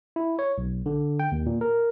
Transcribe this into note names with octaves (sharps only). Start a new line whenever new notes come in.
E4
C#5
B1
D3
G5
D#2
A#2
A#4